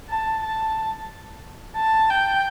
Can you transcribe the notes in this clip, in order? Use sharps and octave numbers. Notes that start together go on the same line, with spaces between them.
A5
A5
A5
G5